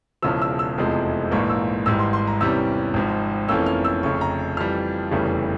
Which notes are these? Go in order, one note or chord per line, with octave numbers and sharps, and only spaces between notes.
E1 E2 C#3 F3 E6
E6
E6
F1 E2 C3 F3 G#3
A#1 G#2 E3 A#3 C#6
E6
G#1 G#2 E3 G3 E6
C6
C6
A#5
E2 C3 E3 G3 C#4 E6
G#1 G#2 F3
F1 F2 E3 A#3 C#4 E6
F6
E6
F1 F2 C#3 C#6
A#5
F2 E3 G3 F6
F1 E2 C#3 E3 G3